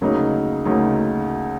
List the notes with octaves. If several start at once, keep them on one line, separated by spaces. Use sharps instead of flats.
D2 C#3 F#3 A#3 D#4
D2 C#3 F#3 A#3 D#4